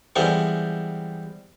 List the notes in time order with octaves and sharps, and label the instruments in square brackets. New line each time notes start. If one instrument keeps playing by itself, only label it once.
[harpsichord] E3 G3 G#3 B3 C4 A4